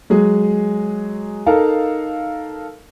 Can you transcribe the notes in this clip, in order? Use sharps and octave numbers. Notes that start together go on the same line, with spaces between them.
F#3 G#3 G#4
D#4 A4 A#4 F5